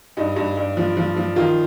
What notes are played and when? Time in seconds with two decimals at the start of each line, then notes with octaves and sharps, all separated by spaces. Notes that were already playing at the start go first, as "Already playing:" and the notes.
0.17 G2 D#4
0.36 G2
0.57 G2
0.77 F3
0.97 F3
1.16 F3
1.36 D#3 F4